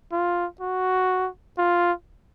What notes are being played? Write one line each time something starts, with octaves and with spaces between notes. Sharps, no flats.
F4
F#4
F4